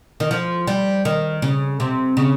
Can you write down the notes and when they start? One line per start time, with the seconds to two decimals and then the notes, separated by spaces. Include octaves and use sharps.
0.20 D#3
0.31 F3
0.67 G3
1.05 D#3
1.42 C#3
1.80 C3
2.17 C#3